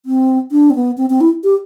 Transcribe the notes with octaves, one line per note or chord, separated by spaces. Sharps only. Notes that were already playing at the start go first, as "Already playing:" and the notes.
C4
D4
C4
B3
C4
C4
E4
G4